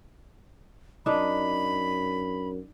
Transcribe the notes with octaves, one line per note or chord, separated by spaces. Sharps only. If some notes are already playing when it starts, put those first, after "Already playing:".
F#2 D4 D#4 B5